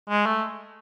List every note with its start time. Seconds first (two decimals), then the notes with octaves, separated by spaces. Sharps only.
0.10 G#3
0.26 A3